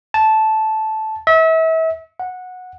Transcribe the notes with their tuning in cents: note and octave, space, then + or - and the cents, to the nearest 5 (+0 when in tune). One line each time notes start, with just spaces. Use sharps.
A5 -10
E5 -35
F#5 -15